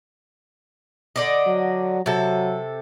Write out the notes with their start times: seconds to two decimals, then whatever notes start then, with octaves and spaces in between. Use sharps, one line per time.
1.16 D3 D5 D#5
1.47 F#3
2.06 C3 F#3 A4